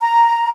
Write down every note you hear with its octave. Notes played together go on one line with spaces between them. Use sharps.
A#5